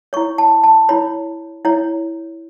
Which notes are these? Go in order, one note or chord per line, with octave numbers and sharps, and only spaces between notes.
E4 C#5 C#6
A5
A5
E4 C#5 B5
E4 C#5